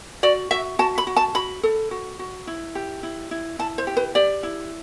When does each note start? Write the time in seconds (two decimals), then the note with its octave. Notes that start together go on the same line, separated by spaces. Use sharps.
0.23 F#4 D5
0.51 F#4 E5
0.79 F#4 A5
0.98 B5
1.07 F#4
1.16 A5
1.35 F#4 B5
1.63 A4
1.91 F#4
2.19 F#4
2.47 E4
2.75 G4
3.03 E4
3.31 E4
3.59 E4 A5
3.78 C5
3.87 G4
3.97 B4
4.15 G4 D5
4.43 E4